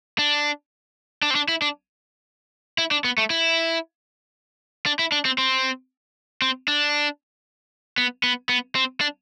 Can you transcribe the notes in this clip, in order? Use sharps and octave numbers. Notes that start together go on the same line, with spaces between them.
D4
D4
C4
D4
E4
D4
E4
D4
B3
A3
E4
D4
E4
D4
C4
C4
C4
D4
B3
B3
B3
C4
D4